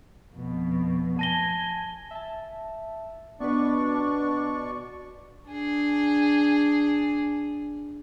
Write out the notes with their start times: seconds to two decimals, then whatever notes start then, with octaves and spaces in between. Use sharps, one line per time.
0.33 F2 B2
1.19 G#5 A5 A#6 G7
2.11 E5 A5
3.40 B2 B3 D4 B4 D5 C#6
5.50 D4 G#4